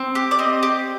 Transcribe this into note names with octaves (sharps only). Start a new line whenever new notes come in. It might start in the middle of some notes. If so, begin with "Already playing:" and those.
Already playing: C4
G4
D5
C4 D#5
G4